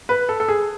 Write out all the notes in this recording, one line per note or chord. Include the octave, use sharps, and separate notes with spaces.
B4
A4
A4
G#4